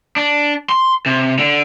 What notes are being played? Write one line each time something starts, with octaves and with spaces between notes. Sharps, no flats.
D4
C6
C3
D3